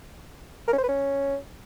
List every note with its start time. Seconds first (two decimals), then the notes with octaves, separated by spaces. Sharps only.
0.68 A#4
0.73 C#4
0.78 C5
0.83 B4
0.89 C#4